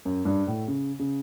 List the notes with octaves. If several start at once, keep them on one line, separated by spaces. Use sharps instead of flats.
F#2
G2
A2
C#3
C#3